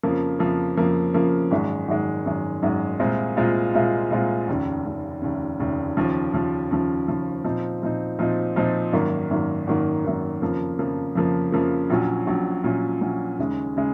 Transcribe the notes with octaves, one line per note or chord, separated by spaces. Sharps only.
F2 C#3 F3 A#3
F2 C#3 F3 A#3
F2 C#3 F3 A#3
F2 C#3 F3 A#3
G#1 F#2 D#3 G#3
G#1 F#2 D#3 G#3
G#1 F#2 D#3 G#3
G#1 F#2 D#3 G#3
C2 A#2 G#3 C4 F4
C2 A#2 G#3 C4 F4
C2 A#2 G#3 C4 F4
C2 A#2 G#3 C4 F4
F1 D#2 C#3
F1 D#2 C#3
F1 D#2 C#3
F1 D#2 C#3
D#2 C#3 F3
D#2 C#3 F3
D#2 C#3 F3
D#2 C#3 F3
A#2 F3 C4 D#4
A#2 F3 C4 D#4
A#2 F3 C4 D#4
A#2 F3 C4 D#4
G#1 F#2 D#3 A#3
G#1 F#2 D#3 A#3
G#1 F#2 D#3 A#3
G#1 F#2 D#3 A#3
F2 C#3 F3 A#3
F2 C#3 F3 A#3
F2 C#3 F3 A#3
F2 C#3 F3 A#3
A#1 A#2 F#3 C#4
A#1 A#2 F#3 C#4
A#1 A#2 F#3 C#4
A#1 A#2 F#3 C#4
D#2 C#3 G#3
C#3 G#3